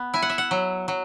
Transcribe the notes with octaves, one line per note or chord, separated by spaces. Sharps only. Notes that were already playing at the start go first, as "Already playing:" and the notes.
Already playing: B3
E4 G#5
F#5
E5
F#5
F#3
F#3